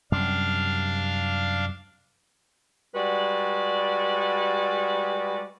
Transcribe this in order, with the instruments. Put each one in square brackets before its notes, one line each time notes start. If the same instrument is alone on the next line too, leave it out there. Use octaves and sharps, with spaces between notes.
[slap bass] F#2 C3 G3 [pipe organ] D4 F5
[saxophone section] G3 G#3 F#4 B4 D5